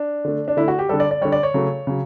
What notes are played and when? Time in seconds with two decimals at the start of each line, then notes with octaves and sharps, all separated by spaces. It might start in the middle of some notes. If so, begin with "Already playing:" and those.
Already playing: D4
0.25 D3 A3
0.48 D4
0.57 D3 A3 E4
0.68 F#4
0.79 G4
0.89 D3 G3 A4
1.00 D5
1.11 D5
1.21 D3 G3 C#5
1.32 D5
1.43 C#5
1.54 C#3 F#3 A3
1.87 C#3 F#3